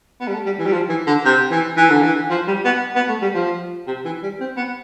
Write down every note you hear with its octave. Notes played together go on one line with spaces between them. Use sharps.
B3
G3
A3
G3
E3
G3
F3
E3
D3
C3
E3
E3
D3
E3
F3
G3
B3
B3
A3
G3
F3
C3
E3
G3
C4
B3